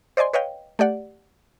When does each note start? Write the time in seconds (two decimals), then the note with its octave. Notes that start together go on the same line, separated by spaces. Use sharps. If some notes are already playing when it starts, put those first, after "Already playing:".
0.17 C5 D5 D#5 G#5 C6
0.33 B4 C#5 D#5 F5 G5
0.79 A3 G4 D5 F#5